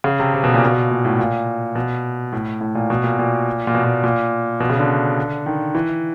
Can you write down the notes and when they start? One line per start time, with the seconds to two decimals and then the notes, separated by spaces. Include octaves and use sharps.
0.04 C#3
0.20 C3
0.34 C3
0.44 B2
0.54 A#2
0.65 B2
0.91 A#2
1.05 A2
1.19 A#2
1.75 B2
2.32 A2
2.61 A2
2.75 A#2
2.90 B2
3.04 A#2
3.19 A#2
3.67 A#2
3.75 B2
3.84 A#2
4.04 A#2
4.60 B2
4.70 C#3
4.79 D3
5.46 D#3
5.75 E3